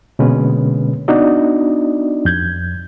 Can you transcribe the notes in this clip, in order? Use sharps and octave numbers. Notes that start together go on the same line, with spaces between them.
B2 D3 G#3 A#3 C#4 B4
B3 D4 D#4 F#4 D5 D#5
F2 G6 G#6